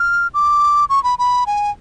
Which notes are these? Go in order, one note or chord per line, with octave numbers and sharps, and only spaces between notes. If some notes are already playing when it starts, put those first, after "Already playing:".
Already playing: F6
D6
C#6
B5
B5
G#5